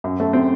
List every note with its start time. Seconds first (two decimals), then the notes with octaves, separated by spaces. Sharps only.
0.04 F#2
0.20 A3
0.33 C4